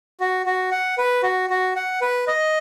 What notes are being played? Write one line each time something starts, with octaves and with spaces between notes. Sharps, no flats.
F#4
F#4
F#5
B4
F#4
F#4
F#5
B4
D#5